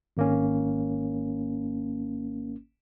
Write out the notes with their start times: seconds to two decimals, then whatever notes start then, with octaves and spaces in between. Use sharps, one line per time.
0.17 G#1 A#3 C#4